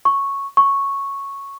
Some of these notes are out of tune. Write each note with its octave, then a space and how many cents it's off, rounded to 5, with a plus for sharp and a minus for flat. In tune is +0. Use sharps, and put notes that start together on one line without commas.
C#6 -5
C#6 -5